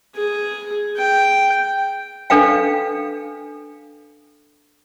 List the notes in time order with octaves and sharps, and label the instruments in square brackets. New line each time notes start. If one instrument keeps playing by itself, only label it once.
[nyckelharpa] G#4
G5
[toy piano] D4 A4 B4 F5 G5